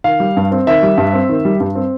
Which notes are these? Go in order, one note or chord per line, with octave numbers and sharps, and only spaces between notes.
D#3 F5
G3
G2
C4
D#3 E5
G3
G2
C4
D#3
G3
G2
C4